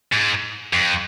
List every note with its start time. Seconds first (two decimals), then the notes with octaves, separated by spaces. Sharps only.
0.12 G#2
0.73 F2